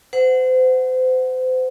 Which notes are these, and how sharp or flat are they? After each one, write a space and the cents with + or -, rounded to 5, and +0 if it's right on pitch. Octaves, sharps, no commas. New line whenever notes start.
C5 -35 F#5 +0